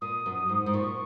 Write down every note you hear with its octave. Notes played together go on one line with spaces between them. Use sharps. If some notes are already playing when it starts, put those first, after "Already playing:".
A#2 D#6
F#2
G#2
G#2 D#6
A#2 C#6